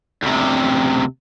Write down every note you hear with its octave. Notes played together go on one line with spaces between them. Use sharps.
D2 C3